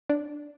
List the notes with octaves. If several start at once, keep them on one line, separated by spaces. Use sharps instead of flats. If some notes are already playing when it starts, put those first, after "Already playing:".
D4